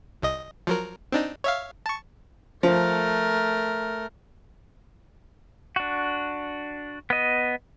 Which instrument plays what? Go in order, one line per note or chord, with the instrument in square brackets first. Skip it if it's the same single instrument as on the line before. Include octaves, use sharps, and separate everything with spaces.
[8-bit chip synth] C2 D#5
F3 F#3 A#4
C4 D4 D#4
C#5 E5 F5
A5 C#6
[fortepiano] F3 [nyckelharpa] A3 A#4
[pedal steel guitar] D4 F#4
B3 D#5